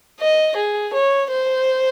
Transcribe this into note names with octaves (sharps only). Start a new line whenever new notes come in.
D#5
G#4
C#5
C5